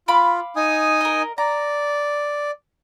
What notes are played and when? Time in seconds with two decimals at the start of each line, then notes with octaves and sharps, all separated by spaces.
0.08 F4 F5 B5 D6
0.56 D#4 G#5 D#6
1.01 A#4 D#5
1.38 D5 A#5